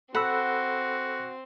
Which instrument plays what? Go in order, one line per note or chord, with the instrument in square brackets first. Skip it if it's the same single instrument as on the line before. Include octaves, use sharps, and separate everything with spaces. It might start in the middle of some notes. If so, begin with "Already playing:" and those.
[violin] C4 [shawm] F#4 [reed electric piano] A4 B5 E6 [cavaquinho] F#5